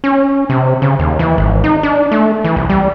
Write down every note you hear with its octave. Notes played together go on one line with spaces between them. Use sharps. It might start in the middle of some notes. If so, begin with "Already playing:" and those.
C#4
C3
C#3
D#2
E3
G#1
D#4
D4
A3
E3
C2
G3